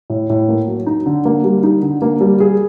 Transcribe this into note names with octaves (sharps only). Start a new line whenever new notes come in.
A2
A2
A#3
F#3
D#4
D3
A#3
G3
D#4
D3
A#3
G3
G#4